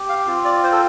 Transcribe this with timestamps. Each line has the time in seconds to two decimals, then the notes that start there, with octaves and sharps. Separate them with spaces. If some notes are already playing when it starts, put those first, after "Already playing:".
Already playing: G4
0.09 F5
0.27 C4 F4
0.45 D5
0.64 C5
0.72 A4